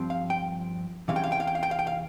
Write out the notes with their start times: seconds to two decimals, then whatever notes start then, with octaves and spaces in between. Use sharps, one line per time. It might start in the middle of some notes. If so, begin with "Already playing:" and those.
Already playing: G2 F3 C4
0.10 F5
0.30 G5
1.08 E2 C3 E3 G#3 C#4 F5
1.16 G5
1.24 F5
1.32 G5
1.40 F5
1.47 G5
1.55 F5
1.63 G5
1.71 F5
1.79 G5
1.87 F5